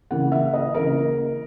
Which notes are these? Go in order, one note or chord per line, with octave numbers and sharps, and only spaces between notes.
C#3 E3 A#3 F#5
E5
D#5
C#3 E3 A#3 A#4